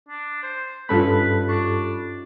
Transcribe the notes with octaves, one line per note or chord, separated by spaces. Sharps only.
D4
C5
G2 C#4 D#4 F4 A4 B4 B5
D4 G4 C#6